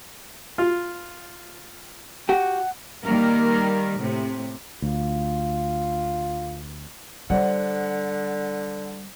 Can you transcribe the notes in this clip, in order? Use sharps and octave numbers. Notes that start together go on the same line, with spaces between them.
F4
F#4 G4 F#5
D#3 G3 A#3 A#4
A2 C3
D2 F4
D3 G3 C5 D5 F#5